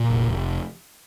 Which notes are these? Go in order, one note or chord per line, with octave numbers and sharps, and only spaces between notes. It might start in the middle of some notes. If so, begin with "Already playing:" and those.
Already playing: A#2
F1
F1